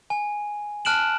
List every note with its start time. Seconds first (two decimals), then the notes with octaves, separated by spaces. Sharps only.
0.10 G#5
0.85 A5 F6 F#6 D7 E7 F#7